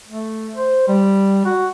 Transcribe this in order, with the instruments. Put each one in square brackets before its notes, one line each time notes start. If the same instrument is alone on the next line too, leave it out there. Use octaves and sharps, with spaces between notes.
[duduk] A3
C5
G3
F#4